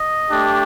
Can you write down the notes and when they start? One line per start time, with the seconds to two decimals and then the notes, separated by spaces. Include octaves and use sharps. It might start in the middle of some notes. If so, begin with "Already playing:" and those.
Already playing: D#5
0.30 A3 D4 G4